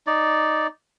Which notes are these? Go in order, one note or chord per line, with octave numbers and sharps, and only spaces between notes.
D#4 D5